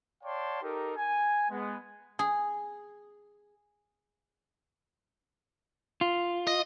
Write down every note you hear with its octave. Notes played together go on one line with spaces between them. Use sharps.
C#5 D5 F5 G5 A5 C6
D#4 G4 A4 A#4
G#5
G#3 B3
G#4
F4
D#5